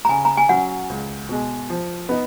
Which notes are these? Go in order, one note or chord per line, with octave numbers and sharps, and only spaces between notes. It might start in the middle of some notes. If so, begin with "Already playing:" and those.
A#5
C#3 G#5
A#5
G#5
F#3 C#4 F#5
C#2
B2 G#3
F3
B3 D#4